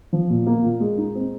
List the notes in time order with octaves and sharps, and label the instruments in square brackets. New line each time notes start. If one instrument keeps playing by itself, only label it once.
[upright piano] F3
A#2
A#3
A#2
G#3
D#4
C4